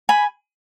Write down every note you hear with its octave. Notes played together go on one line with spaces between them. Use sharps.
G#5 B5